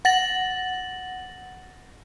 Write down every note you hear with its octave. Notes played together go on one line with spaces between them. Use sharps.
F#5 A6 A#6 F#7